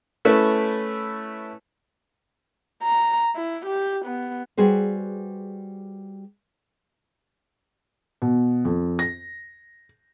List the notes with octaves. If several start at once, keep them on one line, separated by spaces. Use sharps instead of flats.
A3 C#4 E4 A4 B4
A#5
E4
G4
B3
G3 F#4 G#4 B4 C5
B2
F2
A#6